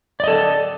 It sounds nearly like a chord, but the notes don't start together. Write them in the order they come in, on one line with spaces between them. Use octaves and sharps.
D5 D#5 A4